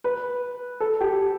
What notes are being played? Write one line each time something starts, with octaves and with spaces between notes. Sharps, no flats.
B4
A4
G4